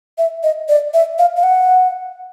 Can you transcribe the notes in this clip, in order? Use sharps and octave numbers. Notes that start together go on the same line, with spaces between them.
E5
D#5
D5
E5
F5
F5
F#5